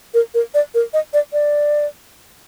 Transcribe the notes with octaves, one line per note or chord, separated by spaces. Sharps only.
A#4
A#4
D5
A#4
D#5
D5
D5